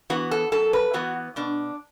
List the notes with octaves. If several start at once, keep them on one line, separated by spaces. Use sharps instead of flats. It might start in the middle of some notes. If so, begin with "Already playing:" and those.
E3 B3 F#4
A4
F#2 A4
B4
E3 B3 F#4
B2 D4